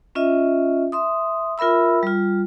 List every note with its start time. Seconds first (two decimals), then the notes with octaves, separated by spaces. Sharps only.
0.15 C#4 F4 D#5 E5
0.92 E5 C6 D#6
1.58 F4 A#4 E5 B5 E6
2.03 G3 F4